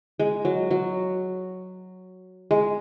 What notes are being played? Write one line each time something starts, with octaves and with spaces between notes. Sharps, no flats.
G#3
F#3
F#3
G#3